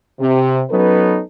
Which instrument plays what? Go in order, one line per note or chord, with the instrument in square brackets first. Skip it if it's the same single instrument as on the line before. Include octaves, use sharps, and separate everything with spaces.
[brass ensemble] C3
F#3 B3 C#4 D#4 A4 B4